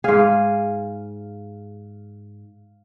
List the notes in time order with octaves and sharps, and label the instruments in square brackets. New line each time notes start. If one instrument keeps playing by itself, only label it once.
[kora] G#2 G#4 [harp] F5